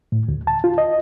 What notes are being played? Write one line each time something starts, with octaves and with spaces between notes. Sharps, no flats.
A2
D2
A5
F4
D#5